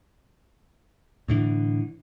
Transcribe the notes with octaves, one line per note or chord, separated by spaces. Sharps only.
A2 D3 E3